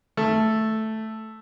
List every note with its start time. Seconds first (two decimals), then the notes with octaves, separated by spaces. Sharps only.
0.17 A3